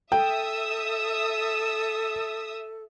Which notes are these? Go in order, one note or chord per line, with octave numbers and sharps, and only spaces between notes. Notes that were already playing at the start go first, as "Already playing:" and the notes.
A4 E5 G5 D#6 E6